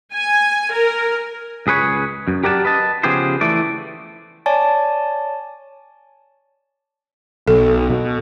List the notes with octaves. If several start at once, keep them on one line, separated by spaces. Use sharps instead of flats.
G#5
A#4
C#2 G#4 B4 C#5
F#2
G4 A#4 D5 F#5 G#5 A5
B4 D#5 A5
C#3 F3 B3 G4 G#4 C5
E3 A3 D5
C#5 D5 G#5 A5
B1 A4
B2